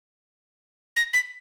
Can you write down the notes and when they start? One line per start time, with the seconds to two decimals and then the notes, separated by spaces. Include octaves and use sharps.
0.96 A#6
1.13 B6